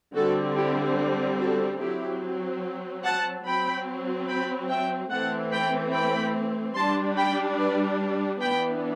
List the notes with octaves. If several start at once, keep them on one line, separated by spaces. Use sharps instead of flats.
D3 G3 C4 F#4 A4
E4 G4
F#4 A4
F#3 C4 E4 G4
F#5 A5
F#3 C4 G5 B5
G5 B5
E5 G5
E3 A3 C4 F#5 A5
G5 B5
G5 B5
G3 D4 A5 C6
G5 B5
B4 D5
E3 B3 D4 G5 B5